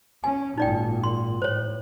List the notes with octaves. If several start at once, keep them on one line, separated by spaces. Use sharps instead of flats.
C#4 G#5
G#1 A#2 D#4 D5 G5
C6
A2 C5 C#5